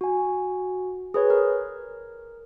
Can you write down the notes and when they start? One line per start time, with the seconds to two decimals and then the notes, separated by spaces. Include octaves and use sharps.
0.01 F#4 G#5
1.14 G#4 B4 C#5
1.30 A#4